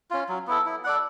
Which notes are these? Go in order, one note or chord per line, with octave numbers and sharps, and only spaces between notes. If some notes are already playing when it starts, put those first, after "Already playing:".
C#4 F4
F#3
B3 E4 A4
E4
A4 D5 F#5